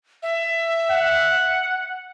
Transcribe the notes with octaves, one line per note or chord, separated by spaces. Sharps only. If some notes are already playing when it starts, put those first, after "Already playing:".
E5
F#5